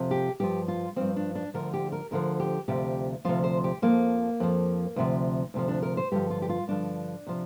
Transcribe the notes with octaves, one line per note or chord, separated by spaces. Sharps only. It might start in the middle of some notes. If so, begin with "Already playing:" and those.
Already playing: F2 C3 F3
G4
G2 F3 G4
F4
G2 F3 C4
D4
D4
D2 D3 F3 A#4
G4
A#4
D2 D3 F3 A#4
G4
D2 C3 F3 G4
D2 C3 F3 F4
C5
G4
F2 F3 A#3
F2 F3
D2 C3 F3
D2 C3 F3
D4
A#4
C5
G2 D3 F3 G4
F4
G4
F4
G2 D3 F3 D4
C3 F3